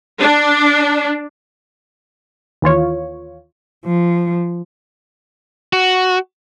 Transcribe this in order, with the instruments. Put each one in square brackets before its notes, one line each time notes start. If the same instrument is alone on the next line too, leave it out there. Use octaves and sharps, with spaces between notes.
[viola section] D4
[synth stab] D#2 E3 F4 C#5
[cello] F3
[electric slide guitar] F#4